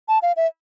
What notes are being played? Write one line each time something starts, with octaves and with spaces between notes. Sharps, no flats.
A5
F5
E5